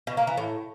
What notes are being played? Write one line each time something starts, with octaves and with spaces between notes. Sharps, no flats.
B2
A#3
E3
A2